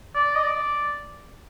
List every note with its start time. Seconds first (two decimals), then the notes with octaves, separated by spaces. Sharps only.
0.15 D5
0.36 D#5
0.43 D5